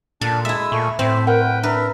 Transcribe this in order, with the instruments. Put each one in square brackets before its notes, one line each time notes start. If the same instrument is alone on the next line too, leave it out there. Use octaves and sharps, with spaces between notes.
[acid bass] A#2 [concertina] D4 [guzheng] A4
[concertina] G#3 D#6 E6 [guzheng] E4 E5
[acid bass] A#2 [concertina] A3 G#5 C#6
[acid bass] A2 [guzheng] C4 [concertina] C5 E5
[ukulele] A#4 F#5 [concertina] B4 G5
[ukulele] D4 [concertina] A#4 E5 [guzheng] B4